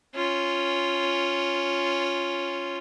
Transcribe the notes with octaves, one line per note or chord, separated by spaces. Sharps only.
C#4 F4